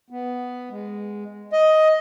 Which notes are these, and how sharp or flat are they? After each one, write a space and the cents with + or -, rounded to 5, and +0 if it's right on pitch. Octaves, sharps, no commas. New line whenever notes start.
B3 +5
G#3 -10
D#5 +10